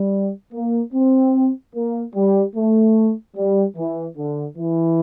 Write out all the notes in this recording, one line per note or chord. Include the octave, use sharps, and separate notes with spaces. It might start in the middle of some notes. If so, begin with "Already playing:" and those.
Already playing: G3
A#3
C4
A#3
G3
A3
G3
E3
D3
E3